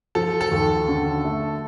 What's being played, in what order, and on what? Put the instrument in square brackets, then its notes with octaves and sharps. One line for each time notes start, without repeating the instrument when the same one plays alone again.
[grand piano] F3 [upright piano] A4
[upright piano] A4
[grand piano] D#2
D3
A3